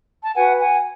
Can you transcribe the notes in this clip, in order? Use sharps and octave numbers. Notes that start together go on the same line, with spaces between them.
A5
F#4 B4 F#5 G#5
F#5 G#5